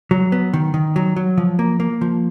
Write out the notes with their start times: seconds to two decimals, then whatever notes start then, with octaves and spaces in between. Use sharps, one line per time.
0.11 F#3
0.32 B3
0.54 D#3
0.74 D#3
0.96 F#3
1.16 F#3
1.38 F3
1.59 A#3
1.80 A#3
2.01 F3